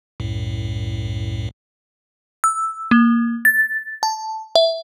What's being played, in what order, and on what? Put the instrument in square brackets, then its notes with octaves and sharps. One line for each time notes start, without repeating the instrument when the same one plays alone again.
[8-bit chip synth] C2 F#2 A2
[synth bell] E6
A#3
A6
A5
E5